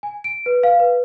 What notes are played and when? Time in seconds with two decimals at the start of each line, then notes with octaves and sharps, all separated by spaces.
0.03 G#5
0.24 D7
0.46 B4
0.63 F5
0.80 B4